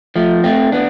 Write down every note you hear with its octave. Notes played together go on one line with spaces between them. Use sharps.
F3 A3
A3 C4
B3 D4